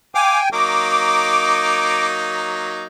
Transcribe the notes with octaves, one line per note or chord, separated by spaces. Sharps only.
F5 G5 G#5 D6
F#3 A#3 D#4 D6